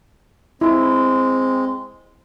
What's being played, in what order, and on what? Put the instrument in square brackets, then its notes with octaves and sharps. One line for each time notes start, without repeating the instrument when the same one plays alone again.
[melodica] G#3 [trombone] C4 [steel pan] E4